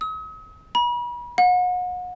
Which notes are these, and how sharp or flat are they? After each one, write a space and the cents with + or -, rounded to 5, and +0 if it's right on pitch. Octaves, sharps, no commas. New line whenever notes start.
D#6 +45
B5 -40
F#5 -35